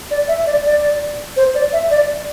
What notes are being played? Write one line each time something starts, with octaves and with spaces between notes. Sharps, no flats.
D5
E5
D5
D5
C5
D5
E5
D5